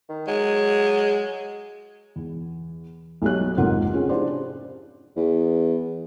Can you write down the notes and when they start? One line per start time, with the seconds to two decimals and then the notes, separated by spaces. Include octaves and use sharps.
0.09 D#3
0.27 F#3 G#3
2.16 E2
3.22 B1 A3 F#4 G4 C#5 F#6
3.57 F1 G#2 C3 A#3 F4 F#5
3.93 F3 C4 C#4 F4 G#4
4.09 D4 E4 G4 G#4 C5 D5
5.16 E2